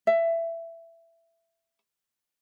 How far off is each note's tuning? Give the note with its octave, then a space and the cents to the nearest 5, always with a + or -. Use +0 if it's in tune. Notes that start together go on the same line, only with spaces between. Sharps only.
E5 +15